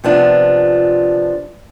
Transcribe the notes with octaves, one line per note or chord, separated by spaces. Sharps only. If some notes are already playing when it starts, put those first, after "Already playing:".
C3 F3 B3 D4 F4